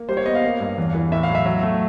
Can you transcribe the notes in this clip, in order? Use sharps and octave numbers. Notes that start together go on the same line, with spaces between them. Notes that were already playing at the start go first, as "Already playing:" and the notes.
Already playing: A#3
G3 C5
C#5
B3 D#5
F5
A#3
G2
E2
E3
A2 E5
F5
F#3
E5
F#3
A3